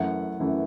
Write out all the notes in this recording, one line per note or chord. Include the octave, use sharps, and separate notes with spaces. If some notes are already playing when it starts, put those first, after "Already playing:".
Already playing: F#2 E3 A3 F#5
F#2 E3 A3